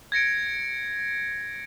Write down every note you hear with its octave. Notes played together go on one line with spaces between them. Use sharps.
G#6 A#6 C#7 D7